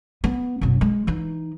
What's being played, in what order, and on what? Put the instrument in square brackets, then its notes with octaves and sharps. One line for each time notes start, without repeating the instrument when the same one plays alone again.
[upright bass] B3
F#1 B2
G#3
E3 D#4